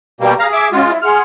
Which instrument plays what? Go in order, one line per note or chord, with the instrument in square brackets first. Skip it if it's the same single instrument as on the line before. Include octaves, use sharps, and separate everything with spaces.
[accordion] B2 G3 A#3 [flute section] G4 D5 G5
[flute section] G#4 [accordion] F5 A#5
[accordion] E5 D6
[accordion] G#3 F4 [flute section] C#4 F#4
[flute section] E4
[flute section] G#4 F#5 C6 [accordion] F6